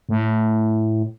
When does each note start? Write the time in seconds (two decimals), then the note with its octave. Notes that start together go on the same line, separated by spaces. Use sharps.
0.09 A2